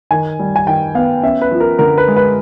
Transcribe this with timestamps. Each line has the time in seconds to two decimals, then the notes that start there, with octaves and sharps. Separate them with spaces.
0.11 D#3 G#5
0.39 G3
0.56 G#5
0.66 D#3 G5
0.95 B3 F5
1.23 C#4 E5
1.42 B4
1.51 F3
1.60 A#4
1.79 D3 A#4
1.98 B4
2.08 G#3
2.16 B4